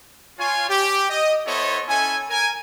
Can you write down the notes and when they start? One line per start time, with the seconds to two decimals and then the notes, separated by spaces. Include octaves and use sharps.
0.39 F4 C#5 G#5
0.69 G4
1.10 D#5
1.47 B3 E4 A4 C5 C#5 D#5
1.88 C#4 E4 A4 G#5
2.30 A#4 G#5